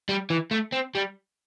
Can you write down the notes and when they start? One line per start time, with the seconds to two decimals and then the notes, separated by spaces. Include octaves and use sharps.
0.09 G3
0.30 E3
0.51 A3
0.72 C4
0.95 G3